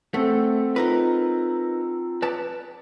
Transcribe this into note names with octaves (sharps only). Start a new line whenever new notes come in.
A3 C4 A4 F#5
D#4 F4 A#4 B4 A#5
B4 D5 A5